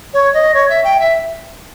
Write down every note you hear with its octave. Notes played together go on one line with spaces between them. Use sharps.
C#5
D#5
C#5
E5
G5
E5